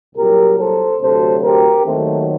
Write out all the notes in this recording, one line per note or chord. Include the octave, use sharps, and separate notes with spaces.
C2 A#2 F#3 G4 A#4
A4 C5
D2 C3 F#3 A4 C5
G4 A#4
D#2 D#3 F#3 A3 C4